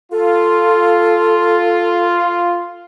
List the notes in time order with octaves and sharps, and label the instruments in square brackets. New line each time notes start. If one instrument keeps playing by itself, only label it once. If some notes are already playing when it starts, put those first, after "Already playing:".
[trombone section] F4 [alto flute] A4